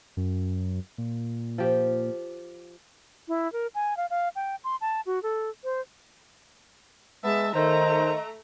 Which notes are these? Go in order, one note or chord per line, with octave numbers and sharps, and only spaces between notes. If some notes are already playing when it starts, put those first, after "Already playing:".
F#2
A#2
F3 G4
E4
A#4
G#5
F5
F5
G5
C6
A5
F#4
A4
C5
G#3 B3 E5 A5
D#3 A3 C5 D#5 A#5